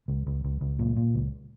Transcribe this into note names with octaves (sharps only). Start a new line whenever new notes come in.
C#2
C#2
C#2
C#2
A#2
A#2
C#2